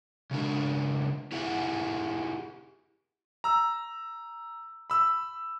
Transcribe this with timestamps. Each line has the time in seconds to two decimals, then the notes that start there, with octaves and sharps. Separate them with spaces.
0.31 C#3 G#3 D4 A#4
1.32 E4 G4 G#4 F#5
3.44 A#5 E6
4.90 B5 E6